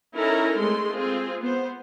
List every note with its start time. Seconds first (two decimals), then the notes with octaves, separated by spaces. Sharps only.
0.15 C#4 D#4 E4 A4 A#4 A#5
0.59 G#3 A3 C4 C6
0.92 C4 F4 G#4
1.41 B3 C5